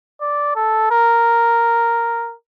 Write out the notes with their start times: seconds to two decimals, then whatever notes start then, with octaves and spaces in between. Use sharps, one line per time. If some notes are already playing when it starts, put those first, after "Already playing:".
0.21 D5
0.55 A4
0.91 A#4